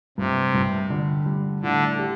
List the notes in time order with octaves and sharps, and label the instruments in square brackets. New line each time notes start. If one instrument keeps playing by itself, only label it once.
[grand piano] G2 [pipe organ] C3
[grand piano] G2
D3
G3
[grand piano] A2 [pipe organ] D3
[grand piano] G4